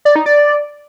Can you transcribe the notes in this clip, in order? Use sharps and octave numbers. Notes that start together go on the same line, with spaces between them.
D5
D#4
D5